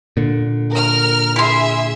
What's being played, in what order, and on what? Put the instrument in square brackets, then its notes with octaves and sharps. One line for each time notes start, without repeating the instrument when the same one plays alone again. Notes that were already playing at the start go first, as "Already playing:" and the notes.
[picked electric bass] A#2 D3
[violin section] A#4 F6
[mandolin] E4 C6 [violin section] G#4 E5